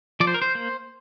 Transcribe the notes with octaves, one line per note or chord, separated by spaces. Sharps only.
F3 D5
C5
A#4
C5
A#3